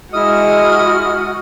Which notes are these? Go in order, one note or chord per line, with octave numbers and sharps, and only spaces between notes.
G#3 E4 F#4 D#5 D#6 F6